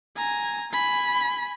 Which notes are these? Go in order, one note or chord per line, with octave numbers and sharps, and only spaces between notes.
G#5 A#5
G#5 B5